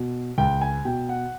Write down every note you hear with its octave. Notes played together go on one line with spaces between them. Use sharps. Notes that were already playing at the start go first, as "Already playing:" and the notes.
Already playing: B2
C#2 G5
G#5
B2 G5
F#5